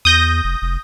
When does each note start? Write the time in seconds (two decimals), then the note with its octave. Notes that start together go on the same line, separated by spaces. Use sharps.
0.05 E2 D#6 G6 A#6
0.44 F1
0.62 F1